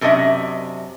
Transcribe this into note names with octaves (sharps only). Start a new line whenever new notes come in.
F#2 C3 A#3 D4 D#5 E5